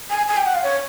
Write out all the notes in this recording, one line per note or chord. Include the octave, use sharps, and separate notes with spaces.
G#5
G#5
G5
F#5
F5
C#5